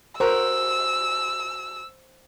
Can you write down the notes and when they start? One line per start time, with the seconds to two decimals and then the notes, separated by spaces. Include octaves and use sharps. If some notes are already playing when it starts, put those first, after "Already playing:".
0.20 F#4 A#4 C5 E6